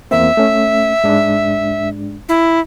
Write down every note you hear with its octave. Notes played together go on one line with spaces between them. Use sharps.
E2 A#3 C4 E5
A3 C#4
G#2 G#3 D4
E4